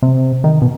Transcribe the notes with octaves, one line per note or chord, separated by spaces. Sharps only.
C3
D#3
B2